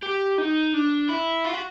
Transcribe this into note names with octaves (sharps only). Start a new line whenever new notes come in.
G4
D#4
D4
E4
F4
F#4